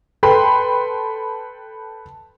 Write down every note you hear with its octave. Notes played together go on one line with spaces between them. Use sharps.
A4 B4 G5 B5 C6